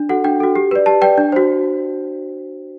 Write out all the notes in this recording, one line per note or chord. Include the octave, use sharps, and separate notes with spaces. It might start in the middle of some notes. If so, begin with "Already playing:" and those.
Already playing: D4
F#4 A4 F#5
D4 G5
F#4 A4
G4
B4 D5
G4 A5
B4 D5 G5
D4
F#4 C5